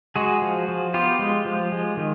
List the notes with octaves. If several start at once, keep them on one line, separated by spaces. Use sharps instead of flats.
G#3 F#4 G#4
F3
F3
B3 F4 G4
G#3
F3
G#3
D#3